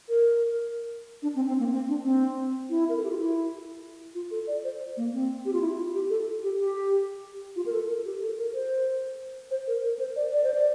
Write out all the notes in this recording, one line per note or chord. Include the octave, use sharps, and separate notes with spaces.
A#4
D4
C4
C4
A#3
C4
D4
C4
E4
A#4
A4
G4
F4
E4
F4
A4
D5
C5
A#3
C4
G4
F4
E4
F4
G4
A4
G4
G4
F4
A#4
A4
A#4
G4
A4
A#4
C5
C5
A#4
A#4
C5
D5
D5
C5
D5